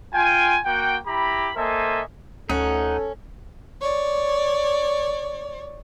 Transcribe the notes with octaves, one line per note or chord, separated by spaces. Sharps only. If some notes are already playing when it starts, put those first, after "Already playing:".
F4 G5 G#5
A#3 F#4 F#5 G5
E4 G4 A#5 B5
A#3 A4 C5 D#5 E5 G#5
D2 C#4 D#4 A4 F#5
C#5 D5